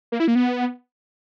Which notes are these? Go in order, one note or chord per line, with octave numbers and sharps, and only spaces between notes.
A#3
E4
A#3
B3